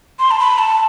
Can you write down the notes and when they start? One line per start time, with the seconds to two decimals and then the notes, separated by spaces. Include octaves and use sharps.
0.19 C6
0.31 A5
0.40 B5
0.58 A5